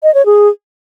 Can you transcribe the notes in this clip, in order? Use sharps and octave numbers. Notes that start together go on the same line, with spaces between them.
D#5
C#5
G#4